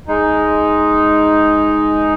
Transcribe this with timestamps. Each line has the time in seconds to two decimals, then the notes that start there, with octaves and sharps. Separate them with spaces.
0.08 G#3 D#4